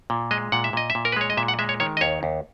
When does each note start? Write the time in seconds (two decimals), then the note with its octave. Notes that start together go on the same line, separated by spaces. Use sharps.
0.10 A#2
0.31 G#3 D#5
0.52 A#2 F#5
0.64 E5
0.73 A#2 D#5
0.90 E5
0.95 A#2
1.05 A#4
1.12 B4
1.16 G#3 C#5
1.30 D#5
1.37 A#2 E5
1.48 F#5
1.59 G#3 E5
1.69 C#5
1.80 D#3 C#5
1.97 D#5
2.01 D#2 C#5
2.23 D#2